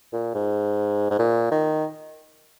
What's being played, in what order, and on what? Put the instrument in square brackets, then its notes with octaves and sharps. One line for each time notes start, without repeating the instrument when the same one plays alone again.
[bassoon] A#2
G#2
G#2
A#2
D#3